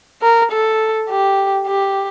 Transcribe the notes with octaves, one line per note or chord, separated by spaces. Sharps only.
A#4
A4
G4
G4